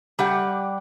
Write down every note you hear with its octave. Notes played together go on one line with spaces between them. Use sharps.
G3 G4 F#5